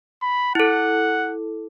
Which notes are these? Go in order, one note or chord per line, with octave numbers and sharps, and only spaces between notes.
B5
E4 A4 F#5